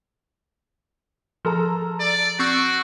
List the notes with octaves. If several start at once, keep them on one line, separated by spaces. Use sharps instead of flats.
F3 G#4 A4 A#5
D5
C4 F#4 C#6 E6